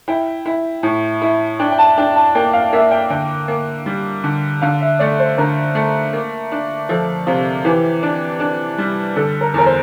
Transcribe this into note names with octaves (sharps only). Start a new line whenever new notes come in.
E4 G5
E4
A2
E4
D4 G5
G5
A5
D4 G5
A5
A#3 G5
F5
A#3 E5
G5
D3 G5
A#3
G3
D3
D3 F5
E5
A3 D5
C5
D3 A#4
A3
A#3
D4
F3 A4
C3 F4
E3 G4
D4
D4
G3
D3 A4
A#4
E2 A#4
C5